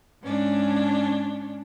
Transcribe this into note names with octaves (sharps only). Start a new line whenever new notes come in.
G#2 C#4 D4